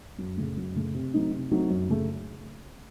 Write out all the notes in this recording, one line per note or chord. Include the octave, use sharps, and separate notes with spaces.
F#2
C#3 A3
F#2
C#3 A3
C3
F#3 A3 C4 D#4
C3
F#3 A3 C4 D#4
F#2
C#3 A3